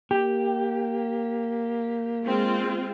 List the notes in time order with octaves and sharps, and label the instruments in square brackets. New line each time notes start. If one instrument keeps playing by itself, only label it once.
[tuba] A#3 [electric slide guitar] G4
[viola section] G#3 C4 F4